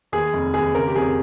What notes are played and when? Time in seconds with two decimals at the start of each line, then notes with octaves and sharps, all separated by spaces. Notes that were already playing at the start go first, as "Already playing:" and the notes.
0.12 D#2 G#4
0.33 F1
0.54 D#2 G#4
0.75 C#3 A#4
0.87 G4
0.95 F1 G#4